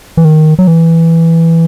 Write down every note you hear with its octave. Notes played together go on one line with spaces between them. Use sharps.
E3
D#3
F#3
E3